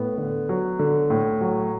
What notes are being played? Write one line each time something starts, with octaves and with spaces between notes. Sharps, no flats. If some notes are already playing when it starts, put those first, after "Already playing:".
Already playing: A2 B3
D3
F#3
D3
A2
F#3